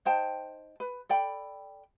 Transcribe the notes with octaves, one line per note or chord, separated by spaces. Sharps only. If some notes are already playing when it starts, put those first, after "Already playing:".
D#4 C5 G5 A5
B4
A4 D5 G5 B5